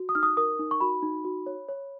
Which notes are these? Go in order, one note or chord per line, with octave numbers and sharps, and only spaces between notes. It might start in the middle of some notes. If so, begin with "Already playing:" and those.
Already playing: F#4
D#6
D#4 F6
D#6
A#4 D#6
D#4
C#6
F#4 B5
D#4
F#4
C#5
C#5